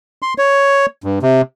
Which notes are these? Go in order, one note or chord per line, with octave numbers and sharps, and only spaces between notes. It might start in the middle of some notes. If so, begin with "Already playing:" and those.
C6
C#5
G2
C3